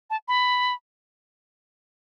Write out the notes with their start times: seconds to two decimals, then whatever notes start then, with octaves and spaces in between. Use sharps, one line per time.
0.10 A5
0.28 B5